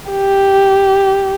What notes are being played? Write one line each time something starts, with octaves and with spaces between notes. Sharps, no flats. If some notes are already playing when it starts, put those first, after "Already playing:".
G4